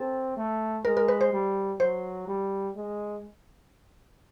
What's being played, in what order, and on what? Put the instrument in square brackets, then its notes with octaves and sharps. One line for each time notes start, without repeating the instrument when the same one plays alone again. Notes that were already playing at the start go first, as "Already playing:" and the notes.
Already playing: [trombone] C4 [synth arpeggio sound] A4
[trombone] A3
[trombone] G#3 [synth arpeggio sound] A#4
[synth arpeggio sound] A#4
B4
C5
[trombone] G3
[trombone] F#3 [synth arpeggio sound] C5
[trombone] G3
G#3